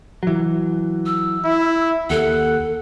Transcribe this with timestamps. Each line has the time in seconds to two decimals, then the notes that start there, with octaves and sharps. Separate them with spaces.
0.23 E3 F#3
1.06 E6
1.45 E4
2.10 D#2 A4 F#5